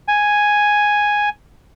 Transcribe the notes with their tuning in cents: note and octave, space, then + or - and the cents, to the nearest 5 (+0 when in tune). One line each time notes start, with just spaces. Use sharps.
G#5 +0